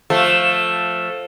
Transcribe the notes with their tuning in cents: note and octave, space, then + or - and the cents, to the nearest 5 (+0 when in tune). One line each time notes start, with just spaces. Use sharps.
F3 +10 A3 +0